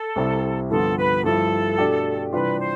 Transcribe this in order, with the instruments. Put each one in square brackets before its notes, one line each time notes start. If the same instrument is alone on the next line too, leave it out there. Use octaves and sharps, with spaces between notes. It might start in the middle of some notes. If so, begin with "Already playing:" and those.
Already playing: [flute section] A4
[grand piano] C2 C3 G3 C4 E4
[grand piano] G2 D3 F3 B3 F4 [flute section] A4
[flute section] B4
[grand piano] G2 F3 A3 E4 [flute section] A4
[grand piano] B2 A3 D4 G4
[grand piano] C3 E3 G3 D4 F4 [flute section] B4
[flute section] C5